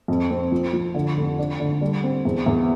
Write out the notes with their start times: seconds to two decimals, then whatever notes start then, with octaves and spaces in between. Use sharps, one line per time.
0.08 F2
0.30 C4
0.52 F3
0.73 F3
0.94 D3
1.17 F1
1.39 D4
1.60 D3
1.81 G3
2.03 C4
2.25 E2
2.46 E2